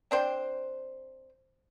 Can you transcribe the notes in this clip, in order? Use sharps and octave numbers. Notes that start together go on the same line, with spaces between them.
C4 D4 C5 G5